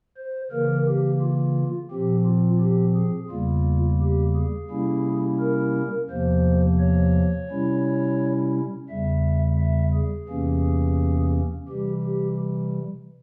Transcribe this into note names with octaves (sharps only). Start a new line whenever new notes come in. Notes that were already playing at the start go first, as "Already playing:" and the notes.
C5
C#3 E3 A#3 A#4
G4
F4
A#2 F3 C4 G4
F4
G4
G#4
E2 C#3 G3 A#3 F4
G4
G#4
C3 G3 A#3 C#4 E4
A#4
E2 C3 F3 A#3 C5
C#5
C3 G3 C#4 E4
E2 C#3 G3 E5
E5
G#4
E2 C3 E3 A#3 C#4
C3 E3 G3 G4
G4